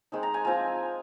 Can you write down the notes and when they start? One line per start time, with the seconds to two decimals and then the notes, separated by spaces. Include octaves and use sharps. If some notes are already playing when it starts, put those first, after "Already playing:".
0.12 G#3 C4 D#4
0.23 A#5
0.34 G#5
0.45 F3 C4 F4 G#5